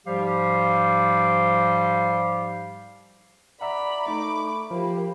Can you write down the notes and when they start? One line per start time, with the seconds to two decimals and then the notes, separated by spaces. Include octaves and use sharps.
0.05 G#2 F3 G3 G4 F5
3.61 D5 E5 F#5 A#5 B5
4.08 A3 D#4 B5 D6
4.71 F3 A#3 G4